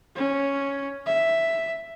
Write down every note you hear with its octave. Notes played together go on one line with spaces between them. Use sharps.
C#4
E5